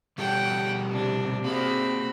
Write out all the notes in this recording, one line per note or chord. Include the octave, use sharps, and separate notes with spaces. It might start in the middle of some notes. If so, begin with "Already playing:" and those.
B2 G3 A4 F#5 G5
C3 D4
A#3 C4 F#4 G#4 B5